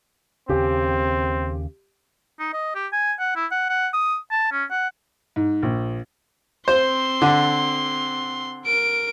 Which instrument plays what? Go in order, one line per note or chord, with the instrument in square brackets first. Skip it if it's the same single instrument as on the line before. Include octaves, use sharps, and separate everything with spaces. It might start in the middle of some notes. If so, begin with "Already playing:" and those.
[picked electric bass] D#2 C#3 [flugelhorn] C4 [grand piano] G4
[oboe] D#4
D#5
G4
G#5
F#5
E4
F#5
F#5
D#6
A5
C#4
F#5
[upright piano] G#2
A#1
[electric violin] C4 C6 [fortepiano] C5
[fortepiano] D3
[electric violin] A#4 D7